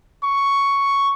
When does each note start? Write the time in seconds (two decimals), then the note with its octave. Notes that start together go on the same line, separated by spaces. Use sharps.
0.24 C#6